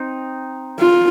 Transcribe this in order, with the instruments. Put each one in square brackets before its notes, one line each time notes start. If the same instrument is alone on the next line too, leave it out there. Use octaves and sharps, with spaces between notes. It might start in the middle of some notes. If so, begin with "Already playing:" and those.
Already playing: [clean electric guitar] C4 D#4
[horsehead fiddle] F4